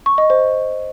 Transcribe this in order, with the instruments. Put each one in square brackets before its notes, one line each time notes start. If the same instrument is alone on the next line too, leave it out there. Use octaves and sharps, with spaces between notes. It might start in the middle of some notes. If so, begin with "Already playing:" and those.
[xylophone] C#6
D#5
C5